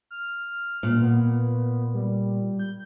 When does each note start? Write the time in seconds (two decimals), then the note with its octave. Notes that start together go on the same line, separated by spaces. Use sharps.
0.11 F6
0.83 A#2
1.01 B3
1.94 G3
2.59 G6